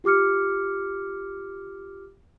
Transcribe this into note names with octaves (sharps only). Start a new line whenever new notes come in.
F4 G4 D6 F6 C#7